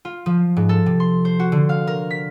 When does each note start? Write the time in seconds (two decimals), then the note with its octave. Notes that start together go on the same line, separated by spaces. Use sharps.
0.05 F4
0.26 F3
0.57 G#2
0.69 A4
0.86 C3
1.00 C6
1.25 C5
1.39 F#4
1.52 D3
1.69 F5
1.87 A#4
2.10 B6